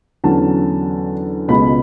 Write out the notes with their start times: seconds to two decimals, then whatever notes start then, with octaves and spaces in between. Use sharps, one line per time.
0.24 E2 D3 F#3 C#4 A5
1.48 C#2 B2 G#3 B5